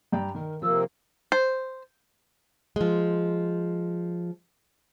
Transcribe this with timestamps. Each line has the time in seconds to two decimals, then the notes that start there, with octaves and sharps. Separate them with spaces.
0.12 G2 D5 G5 A#5
0.34 D#3 A#4
0.62 C3 F3 A#3 E6
1.32 C5
2.76 F3 G#3